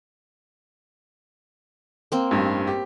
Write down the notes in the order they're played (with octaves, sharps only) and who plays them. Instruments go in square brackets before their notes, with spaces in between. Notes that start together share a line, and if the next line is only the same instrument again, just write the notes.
[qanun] A#3 C4
[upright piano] A1 G2 G3
G4